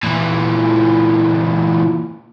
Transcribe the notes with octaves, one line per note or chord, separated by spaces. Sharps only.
A#2 E3